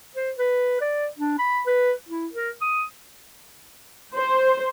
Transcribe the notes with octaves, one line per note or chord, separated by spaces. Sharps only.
C5
B4
D5
D4
B5
B4
E4
A#4
D#6
C5